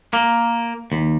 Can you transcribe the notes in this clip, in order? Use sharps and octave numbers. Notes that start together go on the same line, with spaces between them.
A#3
D#2